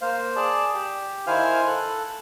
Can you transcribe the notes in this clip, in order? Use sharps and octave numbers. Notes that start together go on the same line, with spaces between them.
A#3 C5 F5
G#4 D5 A5
G4
D#3 E4 C5 F5 G#5 F6
A4 F#6